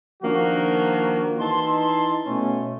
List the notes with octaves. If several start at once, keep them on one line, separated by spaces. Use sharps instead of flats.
D#3 F3 A#3 D4 F#4
E3 D#4 A5 C6
B2 A3 C#4